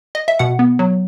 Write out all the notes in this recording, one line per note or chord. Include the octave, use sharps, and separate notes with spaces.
D#5
E5
B2 F#5
B3
F#3